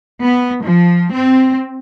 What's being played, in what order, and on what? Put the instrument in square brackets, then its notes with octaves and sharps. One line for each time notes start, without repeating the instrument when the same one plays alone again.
[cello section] B3
F3
C4